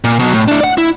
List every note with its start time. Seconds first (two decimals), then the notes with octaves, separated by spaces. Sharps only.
0.04 A#2
0.19 B2 F#3
0.34 A2
0.48 D4 E4
0.61 D5 F#5
0.78 E4